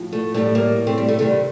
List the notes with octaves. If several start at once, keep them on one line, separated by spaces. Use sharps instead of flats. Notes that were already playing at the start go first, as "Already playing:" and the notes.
Already playing: A2 F3
A3
A2 G3 A3
G3 A#3
A3 C4
G3
A3
C3 D#3 G3 A3